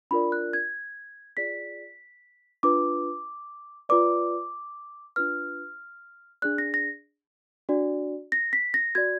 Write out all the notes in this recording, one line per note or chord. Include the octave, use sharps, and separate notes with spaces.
D4 F4 A#4 D5 B5
F#6
G#6
F4 G#4 D5 B6
D4 F4 B4 D6
F4 B4 D5 D6
D4 F4 B4 F6
D4 G#4 D5 F#6
A#6
A#6
D4 F#4 D5
A#6
B6
A#6
F#4 D5 G#6